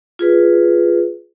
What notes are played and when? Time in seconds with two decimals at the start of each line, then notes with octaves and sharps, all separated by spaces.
0.19 F4 G#4 B4